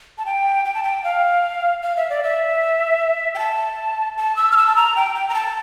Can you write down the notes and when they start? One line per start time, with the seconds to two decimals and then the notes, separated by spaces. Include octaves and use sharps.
0.18 A5
0.26 G5
0.65 G5
0.74 A5
0.83 G5
1.04 F5
1.82 F5
1.97 E5
2.10 D5
2.23 E5
3.35 G5
3.38 A5
4.17 A5
4.36 E6
4.52 F6
4.57 E6
4.67 A5
4.76 A#5
4.96 G5
5.15 G5
5.29 A#5
5.34 A5